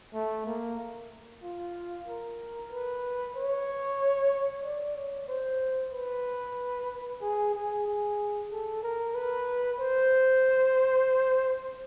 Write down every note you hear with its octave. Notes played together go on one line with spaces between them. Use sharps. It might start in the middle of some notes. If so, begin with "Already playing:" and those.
A3
A#3
F4
A#4
B4
C#5
D5
C#5
C5
B4
G#4
G#4
G#4
A4
A#4
B4
C5